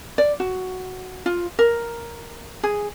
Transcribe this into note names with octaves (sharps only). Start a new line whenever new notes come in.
D5
F#4
F4
A#4
G#4